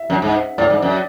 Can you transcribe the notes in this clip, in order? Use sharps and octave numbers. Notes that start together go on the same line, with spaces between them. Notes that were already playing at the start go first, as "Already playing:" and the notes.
Already playing: E5
F#2
G#2
A2 D5
G#2
F#2